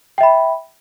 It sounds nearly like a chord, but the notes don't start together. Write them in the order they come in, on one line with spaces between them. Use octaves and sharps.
G5 E5 B5